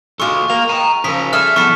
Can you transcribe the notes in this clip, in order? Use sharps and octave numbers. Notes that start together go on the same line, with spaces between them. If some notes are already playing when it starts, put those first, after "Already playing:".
G#3 F4 F#4 A4 C#6
A#4 F5 F7
G5 A#5
C#3 F3 G#4 A#4 G5 B6
G3 G#4 A4 E5 F6
F3 G3 B3 A4 C#6 B6